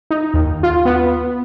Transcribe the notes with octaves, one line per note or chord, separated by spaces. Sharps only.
D#4
D#2
F4
B3